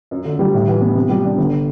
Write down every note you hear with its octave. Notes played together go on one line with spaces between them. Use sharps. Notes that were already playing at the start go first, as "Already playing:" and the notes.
F#2
D3
G3
A2
E3
B3
C3
G3
D4
G1